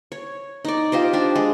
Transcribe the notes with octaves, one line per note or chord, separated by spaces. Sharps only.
C#5
D#4 D5
F4 G4 C5 D#5
D4 G4
G#3